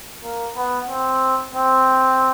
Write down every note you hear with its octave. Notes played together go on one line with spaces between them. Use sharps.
A#3
B3
C4
C4